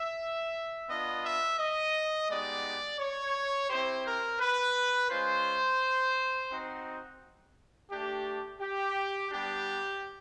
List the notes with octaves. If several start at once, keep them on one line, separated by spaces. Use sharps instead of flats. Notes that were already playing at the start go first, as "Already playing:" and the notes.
Already playing: E5
B3 D4 F4 D#5
E5
D#5
G#3 B3 D#4 G4 D5
C#5
C4 E4 G4 C5
A#4
B4
G#3 C#4 F4 C5
C4 D#4 F#4
A3 D4 G4
G4
G3 B3 D4 G4